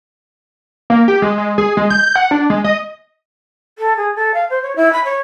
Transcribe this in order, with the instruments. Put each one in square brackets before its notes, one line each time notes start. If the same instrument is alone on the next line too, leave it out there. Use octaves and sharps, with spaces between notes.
[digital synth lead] A#3
G4
G#3
G#3
G#4
G#3
G6
F#5
D4
G#3
D#5
[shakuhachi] A4
G#4
A4
F5
C5
C#5
E4
B5
C#5